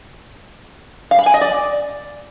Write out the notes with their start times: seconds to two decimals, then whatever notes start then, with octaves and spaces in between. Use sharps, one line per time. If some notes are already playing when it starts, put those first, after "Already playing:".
1.11 F5
1.19 B5
1.26 G#5
1.34 D#5
1.41 D5